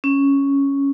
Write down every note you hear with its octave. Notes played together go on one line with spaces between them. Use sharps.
C#4